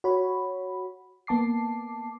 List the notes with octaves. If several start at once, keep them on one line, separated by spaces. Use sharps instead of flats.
F#4 C#5 B5
A#3 B3 A5 D6 C7